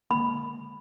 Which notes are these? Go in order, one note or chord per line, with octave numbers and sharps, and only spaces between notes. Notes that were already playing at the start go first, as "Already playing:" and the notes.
D3 G#3 A#3 B5